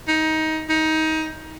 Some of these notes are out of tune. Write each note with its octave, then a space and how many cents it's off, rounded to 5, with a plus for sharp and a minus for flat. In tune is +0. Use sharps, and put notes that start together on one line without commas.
D#4 +20
D#4 +20